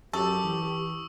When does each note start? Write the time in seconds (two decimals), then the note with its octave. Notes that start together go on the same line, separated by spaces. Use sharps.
0.13 F#2 G4 A4 C#6 D#6 E6
0.44 E3